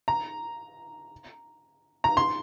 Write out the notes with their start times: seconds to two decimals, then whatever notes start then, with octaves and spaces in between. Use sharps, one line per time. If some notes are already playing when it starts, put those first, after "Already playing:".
0.08 A#5
2.04 A#5
2.17 C6